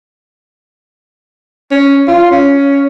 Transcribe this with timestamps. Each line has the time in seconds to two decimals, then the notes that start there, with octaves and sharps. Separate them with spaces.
1.71 C#4
2.08 F4
2.31 C#4